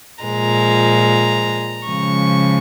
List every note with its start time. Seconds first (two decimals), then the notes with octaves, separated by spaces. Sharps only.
0.24 A#2 F3 G#3 A#5
1.87 C#3 F3 G#3 C#6